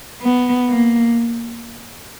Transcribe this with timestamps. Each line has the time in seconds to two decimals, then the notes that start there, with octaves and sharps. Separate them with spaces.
0.22 B3
0.69 A#3